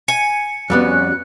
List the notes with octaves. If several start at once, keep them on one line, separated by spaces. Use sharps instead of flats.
G#5 C#7
F2 G3 B3 C#4 F#4 F#6